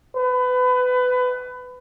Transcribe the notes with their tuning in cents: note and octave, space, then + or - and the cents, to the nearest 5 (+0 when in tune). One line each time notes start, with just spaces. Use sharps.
B4 +25